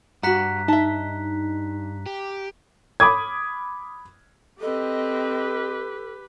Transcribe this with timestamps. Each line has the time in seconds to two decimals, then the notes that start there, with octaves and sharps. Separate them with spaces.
0.23 G2 F#4 F#5 A#5 F#6 B6
0.68 D#4 E5 A5
2.06 G4
3.00 B5 D6 D#6 G#6
4.61 C4 G4 A4 B4 D#5